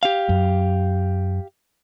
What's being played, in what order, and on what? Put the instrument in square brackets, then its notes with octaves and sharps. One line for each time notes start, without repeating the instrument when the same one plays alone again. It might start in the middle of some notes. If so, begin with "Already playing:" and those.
[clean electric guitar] G4 F5
[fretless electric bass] F#2